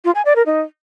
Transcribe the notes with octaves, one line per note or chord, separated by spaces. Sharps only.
F4
G#5
D5
A#4
D#4